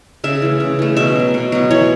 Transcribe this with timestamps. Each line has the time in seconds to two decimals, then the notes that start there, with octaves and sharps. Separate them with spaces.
0.24 C#3 E5
0.42 E3 A3
0.60 C#3
0.79 E3 A3
0.96 B2 E5
1.16 F#3 B3
1.34 B2
1.52 F#3 B3
1.71 E3 C#5